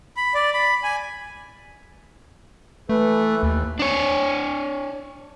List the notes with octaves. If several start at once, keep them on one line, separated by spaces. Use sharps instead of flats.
B5
D5
B5
G#5
E3 A3 A4 B4
D#2
D4 C#5